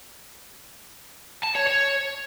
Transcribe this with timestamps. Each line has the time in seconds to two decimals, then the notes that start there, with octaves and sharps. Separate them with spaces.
1.44 A5
1.56 C#5
1.67 C#5